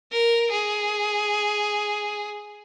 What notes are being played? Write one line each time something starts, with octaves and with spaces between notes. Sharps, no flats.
A#4
G#4